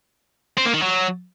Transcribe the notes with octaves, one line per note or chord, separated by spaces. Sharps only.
C4
A#3
D#3
F#3